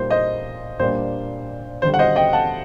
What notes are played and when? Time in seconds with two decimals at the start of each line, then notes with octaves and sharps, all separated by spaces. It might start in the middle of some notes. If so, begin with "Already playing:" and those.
Already playing: A#2 G3 A#3 D#4 C5
0.10 C5 D#5
0.79 A#2 G3 A#3 D4 C5
1.82 D#2 D3 G3 C5
1.94 F#5
1.99 C5 D#5
2.16 D#5 G5
2.33 F#5 A5